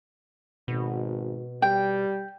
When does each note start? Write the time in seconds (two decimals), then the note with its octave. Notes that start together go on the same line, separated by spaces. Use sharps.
0.68 G#1 B2
1.62 G3 G5